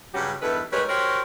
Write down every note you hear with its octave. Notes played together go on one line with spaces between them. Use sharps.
G2 C#3 F#3 G3 C#4 G4
E2 G2 D#3 E4 A4 B4
G3 G#3 D#4 A#4 B4 C#5
F#4 G4 A#4 C5 C#5